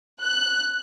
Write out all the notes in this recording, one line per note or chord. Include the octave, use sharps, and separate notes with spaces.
F#6